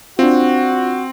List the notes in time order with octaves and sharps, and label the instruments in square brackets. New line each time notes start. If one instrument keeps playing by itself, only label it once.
[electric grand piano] C4 [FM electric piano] D4 F4 [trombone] F#4